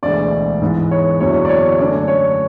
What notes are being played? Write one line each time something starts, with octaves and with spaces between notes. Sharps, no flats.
E1 D2 D3 G#3 D5
G#2 E3 B3
C#5
F#1 E2 D3 F#3 B3 C#5
D5
C#5
F#2 D3 A3 C#4 D5
C#5